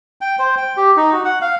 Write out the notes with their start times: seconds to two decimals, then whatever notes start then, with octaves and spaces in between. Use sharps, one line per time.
0.21 G5
0.39 C5
0.57 G5
0.77 G4
0.97 D#4
1.12 F#4
1.25 F#5
1.41 F5